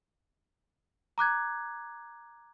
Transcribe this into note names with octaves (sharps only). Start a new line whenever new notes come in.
A#5 D6 F#6 G#6